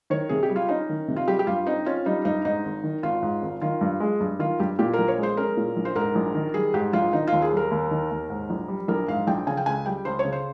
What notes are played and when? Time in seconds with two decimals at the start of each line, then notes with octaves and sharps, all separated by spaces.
0.10 D#3 C#5
0.29 C3 G#4
0.43 G4
0.50 G3
0.56 F4
0.69 C#4 D#4
0.89 D#3
1.08 C3
1.16 F4
1.28 G3 G4
1.39 G4
1.47 G2 F4
1.67 C4 D#4
1.86 C#4 F4
2.06 G3 D#4
2.25 G2 D#4
2.45 G#2 D#4
2.64 G#1
2.84 D#3
3.03 G#1 F4
3.23 G#2
3.42 G#1
3.61 D#3 F4
3.81 G2
4.00 G#3
4.20 G2
4.39 D#3 F4
4.60 G2 G4
4.79 A#2 G4
4.93 A#1 A#4
5.08 C#5
5.18 G#3
5.23 C5
5.37 C#4 A#4
5.57 A#2
5.76 A#1
5.85 C5
5.95 G#2 A#4
6.15 A#1
6.35 D#3
6.54 G3 G#4
6.74 G#2 G4
6.93 A#1 F4
7.13 D#3 D#4
7.27 D#2 F4
7.42 G#4
7.52 G3 A#4
7.71 D#2
7.91 D#3
8.11 D#2
8.30 G#2
8.50 A#1
8.68 G3
8.88 A#1 A#4
9.08 G#2 F5
9.27 A#1 G5
9.47 C#3 G#5
9.57 G5
9.66 C#2 G#5
9.86 G3 G5
10.05 C#2 C5
10.19 C#5
10.25 C#3
10.32 C5